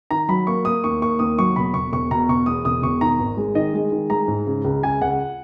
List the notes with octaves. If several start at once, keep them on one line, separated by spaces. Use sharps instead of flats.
D#3 A#5
F#3 B5
A#3 C#6
A#3 D#6
D#2 C#6
A#3 C#6
D#2 D#6
F#3 C#6
E1 B5
E1 C#6
E1 C#6
B2 A#5
E1 C#6
E2 D#6
E1 D#6
E1 C#6
D#3 A#5
G#1
G#3
D#3 D#5
G#3
D#3
G#3 A#5
G#2
C#3
C#2
C#2 G#5
C#2 F#5